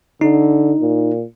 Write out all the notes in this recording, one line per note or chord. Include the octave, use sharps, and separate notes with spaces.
D3 D#4
A#2